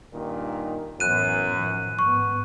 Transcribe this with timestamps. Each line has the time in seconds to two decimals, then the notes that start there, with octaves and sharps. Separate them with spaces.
0.13 G2 A#2 D#3
1.00 F#2 A2 E3 B3 F#6 D#7
1.56 D#3 F3
1.99 G#2 B3 C#6